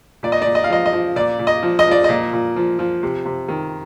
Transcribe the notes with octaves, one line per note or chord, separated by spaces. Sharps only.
A#2 D5
D#5
D5
A#2
D#5
F5
F3 D#5
D#5
F3
A#2 D5
A#2
D#5
F3
D#5
F3 D5
A#2 D#5
A#2
F3
F3
C3
C3
D#3